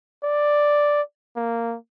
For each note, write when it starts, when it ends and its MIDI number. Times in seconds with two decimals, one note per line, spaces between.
0.24 1.02 74
1.36 1.76 58